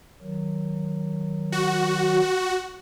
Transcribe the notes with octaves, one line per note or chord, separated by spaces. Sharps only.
D#3 F#3
F#4